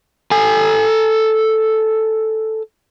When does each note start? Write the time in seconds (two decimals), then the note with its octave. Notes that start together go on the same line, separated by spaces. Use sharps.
0.31 A4 G#5